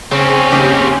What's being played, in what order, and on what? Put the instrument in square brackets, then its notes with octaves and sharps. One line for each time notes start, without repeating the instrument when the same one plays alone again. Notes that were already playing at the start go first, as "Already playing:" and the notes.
[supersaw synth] C#3 [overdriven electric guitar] C4 C#4
[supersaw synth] D#2 C#3 G4